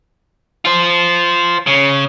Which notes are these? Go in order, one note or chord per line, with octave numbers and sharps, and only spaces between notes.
F4 C5
C#3